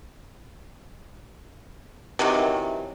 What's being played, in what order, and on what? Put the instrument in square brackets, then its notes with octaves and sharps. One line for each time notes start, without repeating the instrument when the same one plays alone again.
[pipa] C3 D#3 E3 F#3